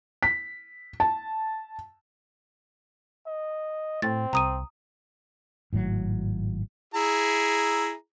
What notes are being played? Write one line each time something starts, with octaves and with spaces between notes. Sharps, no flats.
B6
A5
D#5
A2 C4 A6
C2 A#5 D#6 D#7
G#1 A2 C#3 F#3
E4 G#4 A#5